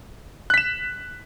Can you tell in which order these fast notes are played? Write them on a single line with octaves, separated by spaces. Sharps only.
F#6 B6 E7